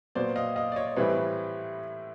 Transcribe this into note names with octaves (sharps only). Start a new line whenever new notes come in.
A#2 F#3 B3 C5 D5
D#5 F5
D#5 F5
D5
C#5 D#5
D5
A2 E3 G3 C4 B4 C#5